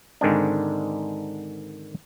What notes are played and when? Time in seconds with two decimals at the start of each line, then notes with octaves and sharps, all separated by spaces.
0.21 G#2 D3 D#3 G#3 C4 D4